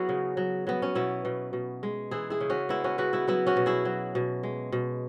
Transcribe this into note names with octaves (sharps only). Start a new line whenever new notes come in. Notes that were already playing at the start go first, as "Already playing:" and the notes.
Already playing: F#3 B3 C#4 E4 F#4 G#4
C#3
F#3
F#3 B3
C#4
B2 B3 E4
B2
B2
G#3
E3 E4 G#4
E4 G#4
C#3
C#4 F#4
G#3 B3 E4
C#4 F#4
C#3 F#4 B4
B3 E4
F#3 B3 E4
C#4 F#4
B2
E4 G#4
F#3
B2
G#3
B2